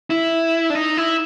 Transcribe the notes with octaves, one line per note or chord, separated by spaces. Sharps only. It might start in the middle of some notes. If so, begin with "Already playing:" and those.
E4
D4
D#4
E4